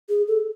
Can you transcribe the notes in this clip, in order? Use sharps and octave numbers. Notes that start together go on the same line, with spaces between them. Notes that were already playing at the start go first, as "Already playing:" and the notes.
G#4
A4